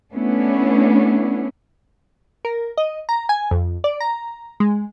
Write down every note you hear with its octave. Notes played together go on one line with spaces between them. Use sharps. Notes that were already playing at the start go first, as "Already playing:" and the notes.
A3 B3 C#4 D4 E4
A#4
D#5
A#5
G#5
F2
D5
A#5
G#3